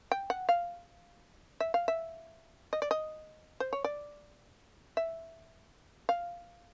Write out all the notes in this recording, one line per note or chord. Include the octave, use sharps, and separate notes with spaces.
G5
F#5
F5
E5
F5
E5
D#5
D5
D#5
C5
C#5
D5
E5
F5